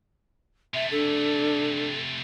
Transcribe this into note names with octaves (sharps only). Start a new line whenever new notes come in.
C3 A3 E5
D4 A4